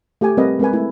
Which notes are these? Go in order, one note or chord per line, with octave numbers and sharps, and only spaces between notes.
A3 G4 G5 G#5
G3 C4 A#4 B4 D#5
G#3 C4 A#4 B4 G#5
A3 E4